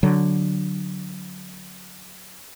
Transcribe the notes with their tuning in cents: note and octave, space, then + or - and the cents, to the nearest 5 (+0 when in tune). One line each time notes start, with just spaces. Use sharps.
D3 +0 F#3 +0